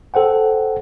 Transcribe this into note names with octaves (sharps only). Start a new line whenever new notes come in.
A4 C5 F#5 G5